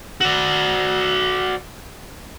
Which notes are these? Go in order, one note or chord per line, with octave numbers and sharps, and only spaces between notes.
F#4 D5